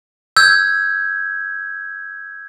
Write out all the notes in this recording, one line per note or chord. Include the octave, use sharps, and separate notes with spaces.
E6 G6 G#6